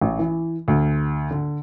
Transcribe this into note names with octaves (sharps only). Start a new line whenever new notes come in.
A1
E3
D2
D3